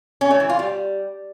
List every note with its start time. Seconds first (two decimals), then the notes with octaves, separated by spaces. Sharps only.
0.21 C#4
0.31 A3
0.40 E3
0.49 F4
0.59 G3